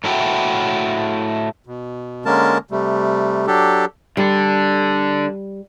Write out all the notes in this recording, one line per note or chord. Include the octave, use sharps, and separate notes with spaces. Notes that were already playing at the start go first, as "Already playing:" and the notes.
A2 A3 E4 F#4 G5
B2
D3 G#3 A#3 C#4 A#4 A5
C3 G3 A3
F#3 D4 G4 A4
D3 G3 D4